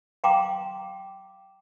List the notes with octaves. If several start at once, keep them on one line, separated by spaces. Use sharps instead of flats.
F5 G5 A#5 C6 D6